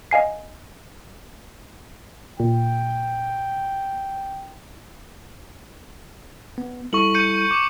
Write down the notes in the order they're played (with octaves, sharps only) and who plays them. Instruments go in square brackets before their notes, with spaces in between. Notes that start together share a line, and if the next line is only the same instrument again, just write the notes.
[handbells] D#5 F5 G#5 C7
[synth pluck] A#2 [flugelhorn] G5
[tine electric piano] B3
[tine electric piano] G3 E4 A4 [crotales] C#6 F#7
[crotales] G6 C#7 D#7
D6